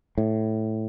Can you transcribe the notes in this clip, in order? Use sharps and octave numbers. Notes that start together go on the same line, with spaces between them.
A2